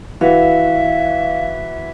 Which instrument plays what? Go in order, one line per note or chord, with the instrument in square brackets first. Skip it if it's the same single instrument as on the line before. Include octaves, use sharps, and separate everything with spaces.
[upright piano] E3 F#4 [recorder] E5 [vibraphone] F5